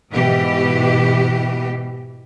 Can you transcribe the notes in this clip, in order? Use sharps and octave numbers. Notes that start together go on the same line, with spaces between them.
G#2 B2 E3 G4